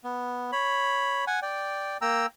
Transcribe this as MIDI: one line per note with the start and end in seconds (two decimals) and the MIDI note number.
0.04 0.51 59
0.52 1.25 73
0.52 1.25 83
1.27 1.40 78
1.27 1.40 80
1.42 1.97 74
1.42 1.97 79
2.01 2.26 58
2.01 2.26 79
2.01 2.26 82
2.01 2.26 88